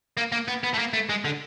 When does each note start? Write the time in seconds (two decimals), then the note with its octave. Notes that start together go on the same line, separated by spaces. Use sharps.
0.17 A#3
0.32 A#3
0.48 B3
0.64 B3
0.74 A3
0.79 A#3
0.93 A3
1.09 G#3
1.25 D3